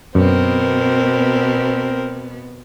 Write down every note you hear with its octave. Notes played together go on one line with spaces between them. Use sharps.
F#2 B2 B3 C4 A#4